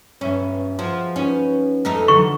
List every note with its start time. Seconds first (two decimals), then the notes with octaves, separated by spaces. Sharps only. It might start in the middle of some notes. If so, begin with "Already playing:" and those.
0.21 G1 C#4 E5 B5
0.79 F3 F#4 G#4 C5
1.16 C#4 D#4 B4
1.85 F2 A3 D#4
2.08 D3 E3 F#3 C#6